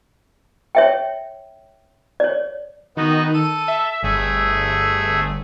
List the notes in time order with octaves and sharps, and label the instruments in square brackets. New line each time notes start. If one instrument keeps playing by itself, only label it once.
[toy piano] C#5 E5 G5
C#5 D5
[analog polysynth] D#3 [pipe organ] B3 D#4 F#4
[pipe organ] A4 [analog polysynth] D#7
[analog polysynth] E5
[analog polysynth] G1 [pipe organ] A3 G#4 E5